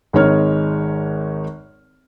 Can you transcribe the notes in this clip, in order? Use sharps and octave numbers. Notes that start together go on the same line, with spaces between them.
G#1 G#3 D#4 C#5 F6